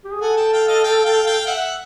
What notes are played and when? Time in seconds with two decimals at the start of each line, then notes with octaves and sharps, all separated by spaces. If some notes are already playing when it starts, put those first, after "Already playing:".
0.05 G4
0.13 G#4
0.21 A4 F#5 G#5
0.37 G5 A5
0.53 F5 G5
0.68 D#5 F5
0.84 F5 G5
1.05 F5 G5
1.26 F5 G5
1.47 E5 F#5